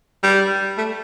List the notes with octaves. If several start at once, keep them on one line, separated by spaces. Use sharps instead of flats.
G3
A3